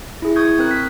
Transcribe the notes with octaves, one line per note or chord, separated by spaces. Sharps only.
E4 G#4
C#6 D#6 G6 G#6
C4 A#4 F#6
B6